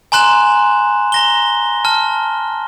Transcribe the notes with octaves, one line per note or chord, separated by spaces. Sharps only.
G#5 A#5 C6 F#6 E7 F#7
A#5 A#6 G7
A5 F6